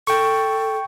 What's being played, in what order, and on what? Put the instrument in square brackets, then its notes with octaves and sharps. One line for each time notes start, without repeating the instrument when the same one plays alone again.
[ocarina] A4 [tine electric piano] G5 C#6